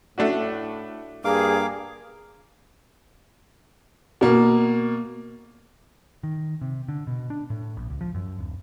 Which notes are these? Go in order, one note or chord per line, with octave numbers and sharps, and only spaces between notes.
A2 A3 D4 F#4
G2 A#3 G#4 F5 D6
B2 A#3
D#3
C3
D3
B2
D4
A2
A#1
C#2
F3
F#2
D1